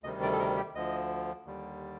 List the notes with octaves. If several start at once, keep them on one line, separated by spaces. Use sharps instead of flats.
D2 C3 D#3 G3 D#5
D5
A4
A#4
G4
D2 D3 F3 D#5
D#2 D3 G3